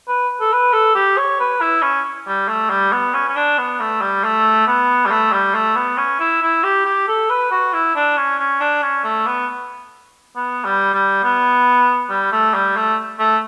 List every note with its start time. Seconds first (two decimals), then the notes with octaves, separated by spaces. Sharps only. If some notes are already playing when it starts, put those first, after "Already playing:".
0.08 B4
0.41 A4
0.52 B4
0.73 A4
0.95 G4
1.17 C#5
1.40 B4
1.61 E4
1.82 C#4
2.27 G3
2.48 A3
2.70 G3
2.93 B3
3.14 C#4
3.28 C#4
3.36 D4
3.58 B3
3.80 A3
4.01 G3
4.24 A3
4.67 B3
5.06 G3
5.11 A3
5.32 G3
5.54 A3
5.76 B3
5.97 C#4
6.19 E4
6.42 E4
6.63 G4
6.85 G4
7.08 A4
7.30 B4
7.51 F#4
7.73 E4
7.95 D4
8.17 C#4
8.39 C#4
8.61 D4
8.82 C#4
9.04 A3
9.26 B3
10.36 B3
10.65 G3
10.94 G3
11.23 B3
12.10 G3
12.32 A3
12.54 G3
12.76 A3
13.19 A3